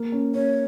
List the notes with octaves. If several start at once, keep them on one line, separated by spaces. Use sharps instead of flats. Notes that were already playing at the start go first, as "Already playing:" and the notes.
Already playing: A#3
C#4
C#4 C#5